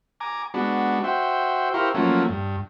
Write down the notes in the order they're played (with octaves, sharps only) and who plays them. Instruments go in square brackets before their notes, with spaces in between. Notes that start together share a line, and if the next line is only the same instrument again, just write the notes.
[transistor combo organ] G#5 A#5 D6
G#3 B3 D4 F#4
F#4 C5 E5 G5
E4 G4 A#4 C5 F5 C#6
F3 F#3 A3 A#3 C#4
G2